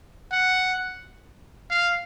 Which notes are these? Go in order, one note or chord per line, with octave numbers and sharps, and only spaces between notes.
F#5
F5